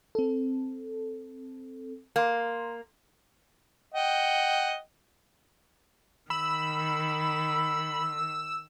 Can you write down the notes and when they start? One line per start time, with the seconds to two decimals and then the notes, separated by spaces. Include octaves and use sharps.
0.15 C4 A4
2.16 A#3 A#5 C6
3.94 D#5 F#5 G5
6.30 D#3 B5 E6